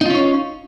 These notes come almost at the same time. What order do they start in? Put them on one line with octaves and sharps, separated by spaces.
D#4 F4 C#4 C#5